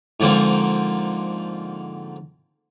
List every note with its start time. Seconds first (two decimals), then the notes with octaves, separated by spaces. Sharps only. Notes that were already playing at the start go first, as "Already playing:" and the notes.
0.20 G#2 D3 F3 A#3 C4